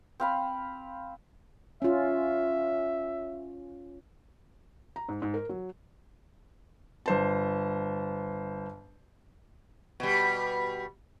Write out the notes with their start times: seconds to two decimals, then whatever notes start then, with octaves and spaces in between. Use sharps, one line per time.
0.20 C4 F5 B5
1.82 C#4 F4 E5
4.96 A#5
5.09 G#2
5.22 G#2
5.34 A#4
5.49 F#3
7.06 G1 C5 A5
10.00 B2 G3